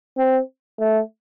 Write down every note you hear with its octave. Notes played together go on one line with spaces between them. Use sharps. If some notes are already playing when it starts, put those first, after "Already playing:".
C4
A3